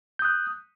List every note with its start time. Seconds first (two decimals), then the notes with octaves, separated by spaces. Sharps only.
0.19 G6
0.22 D#6
0.25 F#6